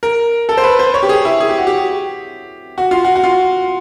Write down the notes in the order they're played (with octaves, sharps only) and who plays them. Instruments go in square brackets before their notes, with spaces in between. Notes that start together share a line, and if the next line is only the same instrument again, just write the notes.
[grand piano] A#4
A4
C5
B4
C5
C#5
G4
G#4
E4
G#4
G4
F#4
G4
F#4
F4
F#4
F#4
F4